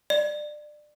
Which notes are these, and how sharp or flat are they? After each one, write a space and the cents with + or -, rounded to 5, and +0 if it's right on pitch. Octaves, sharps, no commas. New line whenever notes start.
D5 +25